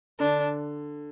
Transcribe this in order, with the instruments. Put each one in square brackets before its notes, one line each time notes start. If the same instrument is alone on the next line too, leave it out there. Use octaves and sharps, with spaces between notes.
[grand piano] D3 [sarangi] D4